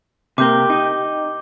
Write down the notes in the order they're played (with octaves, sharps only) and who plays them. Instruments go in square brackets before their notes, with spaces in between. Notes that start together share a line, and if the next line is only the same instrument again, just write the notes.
[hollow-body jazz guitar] C3 A#3 [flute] G4 [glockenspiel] D6 G6 G7
[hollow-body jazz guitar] D#4